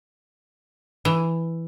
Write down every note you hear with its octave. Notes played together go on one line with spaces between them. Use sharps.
E3